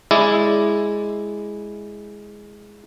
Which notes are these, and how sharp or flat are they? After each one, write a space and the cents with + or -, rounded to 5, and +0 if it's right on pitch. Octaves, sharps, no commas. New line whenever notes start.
G#3 +0 E4 +0 D5 +0